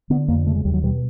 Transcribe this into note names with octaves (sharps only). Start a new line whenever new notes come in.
D3 B3
F2 A#3
C#3 A3
G#3
D#2 G3
F#3
B2 G3